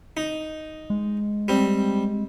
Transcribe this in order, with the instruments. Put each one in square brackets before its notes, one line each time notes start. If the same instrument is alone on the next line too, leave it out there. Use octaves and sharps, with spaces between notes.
[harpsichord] D#4
[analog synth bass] G#3
[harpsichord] G3 C4